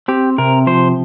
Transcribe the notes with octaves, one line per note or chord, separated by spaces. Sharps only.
C4 G4
C3 A#4
F3 C5